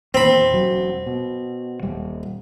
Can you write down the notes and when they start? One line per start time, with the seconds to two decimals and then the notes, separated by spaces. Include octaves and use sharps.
0.14 E2 A#2 D#3 C4 B5
0.51 E1 F#3
1.06 B2
1.83 D#1 G3